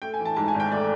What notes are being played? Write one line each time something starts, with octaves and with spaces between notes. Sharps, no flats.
A3 G5
G#5
E3
A5
G#2 A5
G#5
G#1
G5
A3 D5